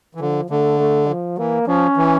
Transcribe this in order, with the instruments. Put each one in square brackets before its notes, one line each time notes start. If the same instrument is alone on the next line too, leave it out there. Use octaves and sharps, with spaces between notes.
[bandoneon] E3
[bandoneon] D3 [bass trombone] F3
[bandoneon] D3 [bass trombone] A3
[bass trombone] A3
F3
[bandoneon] E3 [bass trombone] A#3
[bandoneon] F3 [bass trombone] C#4
[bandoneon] E3